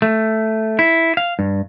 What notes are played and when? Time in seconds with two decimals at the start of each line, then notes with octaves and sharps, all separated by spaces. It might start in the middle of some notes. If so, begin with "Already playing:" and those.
0.02 A3
0.79 E4
1.17 F5
1.39 G2